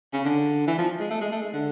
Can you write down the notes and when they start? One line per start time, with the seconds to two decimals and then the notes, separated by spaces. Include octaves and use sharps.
0.13 C#3
0.25 D3
0.67 E3
0.78 F3
1.00 G#3
1.10 A3
1.21 G#3
1.32 A3
1.42 G#3
1.53 D3